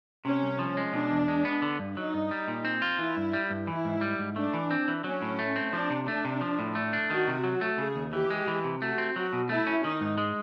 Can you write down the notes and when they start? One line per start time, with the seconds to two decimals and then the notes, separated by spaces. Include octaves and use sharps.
0.25 C3 C#4
0.42 C2
0.59 F3
0.77 G#3
0.93 B2 D4
1.11 E2
1.28 G#3
1.45 B3
1.62 D3
1.79 G2
1.96 F#3 D#4
2.14 G2
2.31 G3
2.48 A#2
2.65 C4
2.82 F4
2.99 E3 E4
3.17 G2
3.33 G3
3.50 G2
3.67 E3 E4
3.85 G#2
4.01 G3
4.19 G#2
4.36 A3 D4
4.54 E3
4.71 C4
4.88 E3
5.04 F#3 C#4
5.22 A2
5.39 A3
5.56 C4
5.73 F3 D4
5.90 C3
6.07 A3 D4
6.25 C3
6.41 F3
6.59 A2
6.75 A3
6.93 D4
7.10 D#3 F#4
7.28 C3
7.44 F#3
7.61 A3
7.78 C#3 G#4
7.96 D#2
8.13 E3 G4
8.30 G#3
8.48 E3
8.64 C3
8.81 A3 F#4
8.98 C4
9.16 F#3 F#4
9.33 B2
9.49 A3 E4
9.67 C#4
9.83 D#3 D#4
10.01 G#2
10.18 G#3